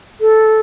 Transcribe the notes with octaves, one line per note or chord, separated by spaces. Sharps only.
A4